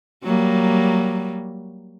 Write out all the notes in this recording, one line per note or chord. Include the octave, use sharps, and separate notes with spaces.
F#3 G3 A#3